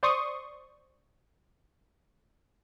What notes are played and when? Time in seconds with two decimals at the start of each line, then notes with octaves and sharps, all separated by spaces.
0.03 C5 D5 C6 C#6 D#6